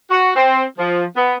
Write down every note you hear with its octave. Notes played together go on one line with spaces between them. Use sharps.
F#4
C4
F3
B3